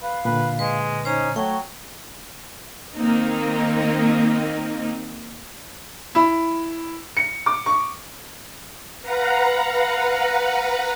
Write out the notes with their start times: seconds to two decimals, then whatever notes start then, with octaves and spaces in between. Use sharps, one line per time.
0.02 B4 F5
0.25 A#2 D3 B4
0.59 G#3 B4
1.05 C#4 D#4 C5 A#5
1.36 F#3 A3 C#5 G5
2.95 D#3 A#3 C4 D#4
6.15 E4
7.17 C#7
7.46 D6
7.66 C#6
9.02 B4 F5 F#5 A#5